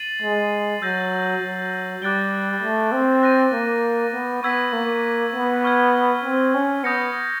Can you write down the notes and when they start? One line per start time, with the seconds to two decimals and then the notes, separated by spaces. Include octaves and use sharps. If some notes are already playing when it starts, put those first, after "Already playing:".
Already playing: A6 C7 D#7 F#7
0.22 G#3
0.82 F#3 E6 G6 A#6
1.42 F#3
2.02 G3 D6 F#6 A6 D7 G7
2.62 A3
2.92 C4
3.23 F#6 A#6 D#7
3.52 A#3
4.14 B3
4.43 B3 C#6 E6 G#6 B6
4.73 A#3
5.34 B3
5.64 C#6 F6 G#6
6.24 C4
6.54 C#4
6.84 B3 D#6 G6 A#6 C#7